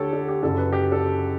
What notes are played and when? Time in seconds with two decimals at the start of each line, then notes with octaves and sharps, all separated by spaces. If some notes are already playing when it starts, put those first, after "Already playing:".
Already playing: D2 D3 G4 A4 C#5
0.13 A4
0.29 G4
0.43 F#1 F#2 C#3 A4
0.58 B4
0.73 G4
0.92 A4